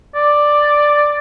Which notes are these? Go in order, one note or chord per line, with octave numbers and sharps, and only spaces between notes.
D5